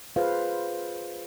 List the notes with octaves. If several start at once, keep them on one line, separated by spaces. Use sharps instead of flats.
F4 G#4 B4 C5 F5